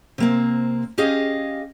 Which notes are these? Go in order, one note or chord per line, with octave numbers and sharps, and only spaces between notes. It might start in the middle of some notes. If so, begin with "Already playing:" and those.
C3 A#3 C4
C#4 G4 G#4 D#5 F5